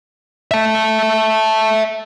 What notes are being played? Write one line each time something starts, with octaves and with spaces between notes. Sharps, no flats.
E5 A5